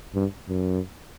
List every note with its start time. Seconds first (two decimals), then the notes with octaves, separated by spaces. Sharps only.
0.15 G2
0.49 F#2